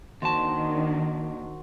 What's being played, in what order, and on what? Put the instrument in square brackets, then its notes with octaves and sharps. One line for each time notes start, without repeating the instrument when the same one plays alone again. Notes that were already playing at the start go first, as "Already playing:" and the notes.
[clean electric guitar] D#2 A5 [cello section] D#3 D4 [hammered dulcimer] C4 F#4 C5